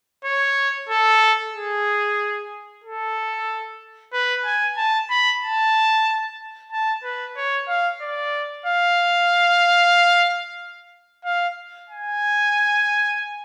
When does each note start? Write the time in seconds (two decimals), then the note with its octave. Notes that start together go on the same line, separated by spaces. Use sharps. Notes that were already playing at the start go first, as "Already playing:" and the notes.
0.24 C#5
0.89 A4
1.54 G#4
2.84 A4
4.13 B4
4.45 G#5
4.77 A5
5.10 B5
5.42 A5
6.72 A5
7.04 B4
7.37 C#5
7.68 F5
8.01 D5
8.66 F5
11.25 F5
11.90 G#5